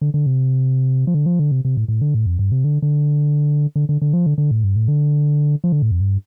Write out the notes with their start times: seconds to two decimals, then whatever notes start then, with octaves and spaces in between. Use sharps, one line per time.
0.01 D3
0.14 D3
0.26 C3
1.07 F3
1.14 D3
1.26 F3
1.39 D3
1.52 C3
1.65 C3
1.77 A2
1.88 A2
2.01 D3
2.15 A2
2.26 F2
2.39 G2
2.52 C3
2.64 D3
2.82 D3
3.76 D3
3.89 D3
4.02 D3
4.13 F3
4.26 D3
4.38 D3
4.51 A2
4.64 G2
4.76 A2
4.88 D3
5.64 F3
5.72 D3
5.82 A2
5.91 F2
6.01 G2